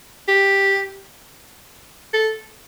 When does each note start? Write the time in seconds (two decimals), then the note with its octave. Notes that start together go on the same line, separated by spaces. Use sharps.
0.28 G4
2.14 A4